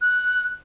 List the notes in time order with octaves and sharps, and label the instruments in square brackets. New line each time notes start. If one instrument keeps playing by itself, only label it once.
[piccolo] F#6